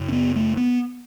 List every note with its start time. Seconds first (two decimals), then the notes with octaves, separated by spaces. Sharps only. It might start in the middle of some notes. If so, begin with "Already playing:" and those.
Already playing: F#2 C#3
0.08 C#4
0.12 B3
0.36 A3
0.57 B3